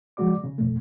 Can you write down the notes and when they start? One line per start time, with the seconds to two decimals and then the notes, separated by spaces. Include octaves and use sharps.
0.17 C#3 F3 G#3 F#4 D5 D6
0.44 C#3
0.58 C2 F2 B2 A3